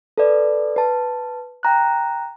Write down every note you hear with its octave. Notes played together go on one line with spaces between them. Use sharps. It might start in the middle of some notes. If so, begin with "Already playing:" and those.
A4 B4 D5
B4 A5
G5 A#5 F#6